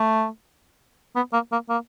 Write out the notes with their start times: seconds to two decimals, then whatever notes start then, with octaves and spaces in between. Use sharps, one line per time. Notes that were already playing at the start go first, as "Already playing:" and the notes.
Already playing: A3
1.16 B3
1.33 A#3
1.52 A#3
1.69 A#3